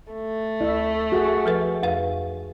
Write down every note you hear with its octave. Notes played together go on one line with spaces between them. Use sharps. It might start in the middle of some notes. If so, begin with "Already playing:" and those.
A3
D2 E4 E5
F#4 G#4 F#5
F3 A4 B4
F2 B4 F5